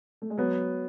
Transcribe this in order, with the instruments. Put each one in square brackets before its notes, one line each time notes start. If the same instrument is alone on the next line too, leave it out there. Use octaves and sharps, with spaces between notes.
[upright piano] A3
G#3
[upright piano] F#3 [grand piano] B3